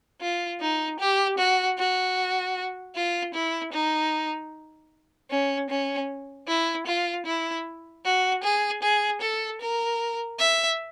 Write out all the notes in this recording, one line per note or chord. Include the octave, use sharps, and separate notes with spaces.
F4
D#4
G4
F#4
F#4
F4
E4
D#4
C#4
C#4
E4
F4
E4
F#4
G#4
G#4
A4
A#4
E5